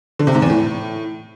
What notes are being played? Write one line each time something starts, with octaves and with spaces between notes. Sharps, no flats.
D3
C3
G#2
E2
A2